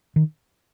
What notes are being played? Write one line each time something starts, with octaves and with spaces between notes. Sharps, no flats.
D#3